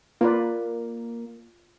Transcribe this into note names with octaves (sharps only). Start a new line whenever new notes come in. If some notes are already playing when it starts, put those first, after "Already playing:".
A#3 F4 B4 D5